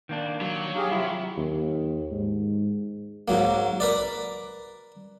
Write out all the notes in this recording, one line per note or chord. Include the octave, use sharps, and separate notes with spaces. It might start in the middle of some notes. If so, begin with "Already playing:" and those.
D#3 A#3 D4
F#3
G4 G#4 F5
C3 E4 F4
D#2
G#2
G#2 F#3 A#3
A#4 B4 D5